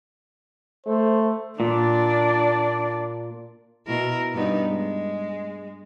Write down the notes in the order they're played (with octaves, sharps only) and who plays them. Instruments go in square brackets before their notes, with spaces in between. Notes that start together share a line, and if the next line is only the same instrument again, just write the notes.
[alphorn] A3 [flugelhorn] C5
[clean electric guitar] A#2 [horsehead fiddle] D4 D5
[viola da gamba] B2 E4 A#4
G2 B3 D#4
G#3